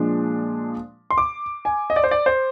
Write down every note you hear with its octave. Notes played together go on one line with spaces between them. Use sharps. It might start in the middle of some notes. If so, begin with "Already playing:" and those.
Already playing: A#2 F3 G#3 D4
C6
D6
G#5
D#5
D5
C5
D5
C5